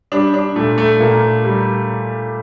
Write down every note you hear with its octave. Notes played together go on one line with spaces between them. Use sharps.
G3 D4
D4
A#2 A3
A3
A#2 A#3
G3